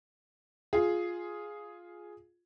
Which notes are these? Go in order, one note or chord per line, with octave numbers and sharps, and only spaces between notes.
F4 G#4